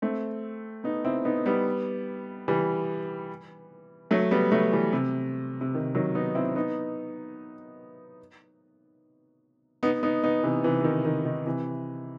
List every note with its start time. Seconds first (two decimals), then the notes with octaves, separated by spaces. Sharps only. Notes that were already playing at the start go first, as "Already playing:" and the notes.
0.02 A3 C4
0.84 B3 D#4
1.05 C4 E4
1.25 B3 D#4
1.46 G3 B3
2.48 E3 G3
4.11 F#3 A3
4.31 G3 B3
4.52 F#3 A3
4.72 E3 G3
4.93 C3
5.61 C3
5.75 D#3
5.95 D#3 F#3
6.15 B3 D#4
6.35 C4 E4
6.56 B3 D#4
9.83 B3 D#4
10.03 B3 D#4
10.23 B3 D#4
10.43 C3 E3
10.64 C3 E3
10.81 C3
10.84 D#3
11.05 D#3
11.25 D#3
11.46 C3 E3